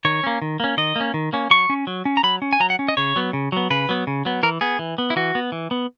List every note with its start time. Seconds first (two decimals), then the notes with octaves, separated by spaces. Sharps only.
0.05 D#3 C#5
0.24 A#3 C#4
0.42 D#3
0.60 A#3 C#4
0.77 D#3 D#5
0.96 A#3 C#4
1.14 D#3
1.33 A#3 C#4
1.50 F#3 C#6
1.70 C#4
1.87 F#3
2.05 C#4
2.17 A#5
2.23 F#3 B5
2.42 C#4
2.53 G#5
2.60 F#3 A#5
2.70 F#5
2.79 C#4
2.88 D#5
2.97 C#3 C#5
3.16 F#3 B3
3.33 C#3
3.52 F#3 B3
3.70 C#3 B4
3.89 F#3 B3
4.07 C#3
4.25 F#3 B3
4.43 E3 A#4
4.61 B3 G#4
4.79 E3
4.98 B3
5.10 E4
5.16 E3 F#4
5.35 B3
5.52 E3
5.71 B3